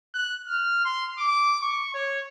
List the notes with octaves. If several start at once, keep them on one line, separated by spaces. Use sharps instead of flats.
F#6
F6
C6
D6
C#6
C#5